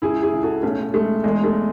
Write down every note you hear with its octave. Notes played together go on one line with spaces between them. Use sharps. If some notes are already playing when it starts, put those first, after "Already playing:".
C#2 E4 G#4
E4 G#4
C#2
F#4 A4
B1 A3 C#4
G#3 A3
E2 G#3
A3